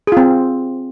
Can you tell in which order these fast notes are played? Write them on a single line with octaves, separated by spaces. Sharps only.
G#4 F4 C4